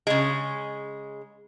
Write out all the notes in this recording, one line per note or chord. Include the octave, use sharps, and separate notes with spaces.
C#3 G#3